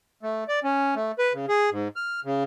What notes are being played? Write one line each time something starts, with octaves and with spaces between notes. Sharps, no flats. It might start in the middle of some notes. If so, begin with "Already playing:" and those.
A3
D5
C#4
A3
B4
C#3
G#4
G#2
F6
C#3